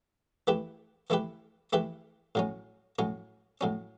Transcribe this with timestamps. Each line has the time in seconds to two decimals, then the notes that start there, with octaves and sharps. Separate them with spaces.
0.47 E3 A3 E4 G4 B4
1.10 E3 A3 E4 G4 B4
1.73 E3 A3 E4 G4 B4
2.35 A2 F#3 C#4
2.99 A2 F#3 C#4
3.61 A2 F#3 C#4